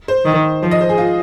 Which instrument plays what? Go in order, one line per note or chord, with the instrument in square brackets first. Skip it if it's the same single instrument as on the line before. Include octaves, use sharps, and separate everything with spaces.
[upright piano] C5
[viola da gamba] D#3
[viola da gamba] F3 [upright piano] C5
[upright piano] D#5
C5
G#4
F4